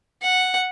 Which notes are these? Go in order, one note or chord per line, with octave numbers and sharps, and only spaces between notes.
F#5